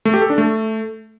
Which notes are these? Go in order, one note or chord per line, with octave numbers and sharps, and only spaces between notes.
A3
G4
A4
D4
A3